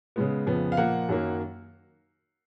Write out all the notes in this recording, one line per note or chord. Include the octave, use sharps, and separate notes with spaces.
C#3 G#3 B3
F2 C#3 F3 B3
F5
A#2 F3 A#3 F#5
F#2 D#3 F#3 A#3